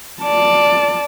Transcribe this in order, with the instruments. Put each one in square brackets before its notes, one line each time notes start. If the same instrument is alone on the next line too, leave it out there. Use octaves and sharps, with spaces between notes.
[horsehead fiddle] D5 A5